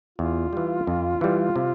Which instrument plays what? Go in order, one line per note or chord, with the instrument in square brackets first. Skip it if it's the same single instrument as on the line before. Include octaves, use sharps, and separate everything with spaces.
[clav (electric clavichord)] E2 [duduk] F4
[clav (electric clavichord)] E3 G3
F2
E3 G3
C3